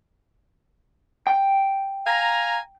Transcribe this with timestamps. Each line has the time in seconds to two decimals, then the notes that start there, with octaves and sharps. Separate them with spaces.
1.27 G5
2.07 F5 G#5 A#5